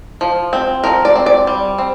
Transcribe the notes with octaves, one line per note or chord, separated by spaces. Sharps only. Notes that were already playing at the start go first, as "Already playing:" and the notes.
F3
C4
F3 A#4
D5
C4
D5
G3
C4